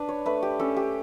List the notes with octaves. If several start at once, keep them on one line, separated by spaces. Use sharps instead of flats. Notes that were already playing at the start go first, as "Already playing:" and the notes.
Already playing: D4 B4
C#5
A3 B4
G4
C#4 A4
G4